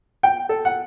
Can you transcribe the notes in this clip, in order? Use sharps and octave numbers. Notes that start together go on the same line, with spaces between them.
G5
A4
F#5